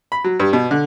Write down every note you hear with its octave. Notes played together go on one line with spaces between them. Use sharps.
B5
F#3
G2
B2
D3